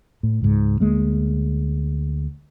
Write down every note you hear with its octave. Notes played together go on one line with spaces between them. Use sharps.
A2
C#2 G#2
D2 G#3 A#3